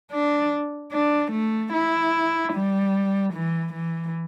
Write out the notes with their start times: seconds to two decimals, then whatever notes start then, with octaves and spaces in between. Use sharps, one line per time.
0.11 D4
0.92 D4
1.32 A3
1.73 E4
2.53 G3
3.33 E3
3.73 E3